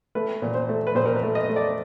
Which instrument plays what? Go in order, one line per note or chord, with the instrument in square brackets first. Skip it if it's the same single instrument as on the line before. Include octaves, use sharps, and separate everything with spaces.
[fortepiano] A3 B4
A#2
C5
A3
B4
A#2 C5
A#4
B4
A3
D#5
A3
D5